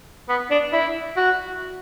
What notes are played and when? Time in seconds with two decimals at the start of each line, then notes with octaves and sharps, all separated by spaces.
0.29 B3
0.51 D4
0.73 E4
1.17 F#4